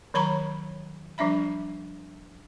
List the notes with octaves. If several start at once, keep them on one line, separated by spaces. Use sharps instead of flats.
D#3 F#3 C#5 A#5 B5 C#6
F3 G3 D4 E5 B5